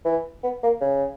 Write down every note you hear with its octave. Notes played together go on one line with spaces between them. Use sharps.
E3
B3
A#3
C#3